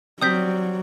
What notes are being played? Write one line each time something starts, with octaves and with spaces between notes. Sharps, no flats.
F#3 G3 C4 D#6 G6 B6